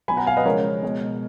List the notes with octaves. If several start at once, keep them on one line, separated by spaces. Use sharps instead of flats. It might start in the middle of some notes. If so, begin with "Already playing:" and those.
B2 F#3 G#5 B5
F#5 A#5
F5 G#5
B4 D#5
C#3 F3 G#3 A#4 C#5
B2 G#3